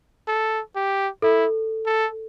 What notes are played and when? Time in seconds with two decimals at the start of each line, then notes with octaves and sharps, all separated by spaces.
0.28 A4
0.76 G4
1.22 E4 A4
1.86 A4